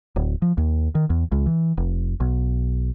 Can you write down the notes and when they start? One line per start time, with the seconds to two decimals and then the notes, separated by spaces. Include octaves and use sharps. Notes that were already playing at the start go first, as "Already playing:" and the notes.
0.16 D1
0.42 F3
0.57 D#2
0.95 D#3
1.10 E2
1.32 C#2
1.46 E3
1.77 F1
2.20 B1